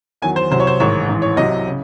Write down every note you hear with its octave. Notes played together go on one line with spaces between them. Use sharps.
E2 D#3 F#3 G#5
C5
C2 C3 F#3 C5
C#5
C5
A1 G#2 D#3 C#5
A1 G#2 E3
C#5
C2 C3 F#3 D#5
C#3